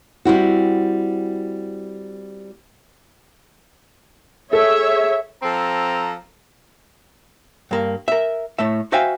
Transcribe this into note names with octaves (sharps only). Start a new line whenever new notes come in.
G3 C4 E4 F#4
G#4 A4 C#5 E5
F3 C4 A4 A#5
G2 A#3
A#4 E5
A2 A3 E5
F#4 C5 E5 F5 G5 G#5